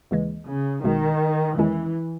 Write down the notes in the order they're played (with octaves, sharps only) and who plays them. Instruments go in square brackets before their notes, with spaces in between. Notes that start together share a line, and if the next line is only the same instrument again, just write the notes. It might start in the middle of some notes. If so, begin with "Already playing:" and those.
[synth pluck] D#2 C#3 E3 G#3
[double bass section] C#3
[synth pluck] B1 B2 G#3 [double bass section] D#3
[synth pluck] E2 D#3 G#3 C#4 E4 [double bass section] E3